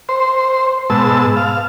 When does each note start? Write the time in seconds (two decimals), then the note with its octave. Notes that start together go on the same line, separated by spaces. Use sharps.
0.09 C5
0.90 G#2 B2 A5 E6
1.37 F5